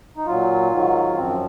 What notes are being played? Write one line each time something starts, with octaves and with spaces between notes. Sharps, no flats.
D#4
A#2 F#3 F4
G#2 D#3 F#3
F#2 F3 C4